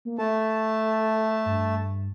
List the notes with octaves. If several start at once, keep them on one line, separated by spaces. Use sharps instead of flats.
A#3
A3 A4 A5
G2